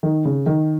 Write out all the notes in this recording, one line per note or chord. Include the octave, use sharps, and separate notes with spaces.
D#3
C#3
D#3